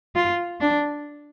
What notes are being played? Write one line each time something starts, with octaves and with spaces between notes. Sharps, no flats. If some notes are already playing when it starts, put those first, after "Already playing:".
F4
D4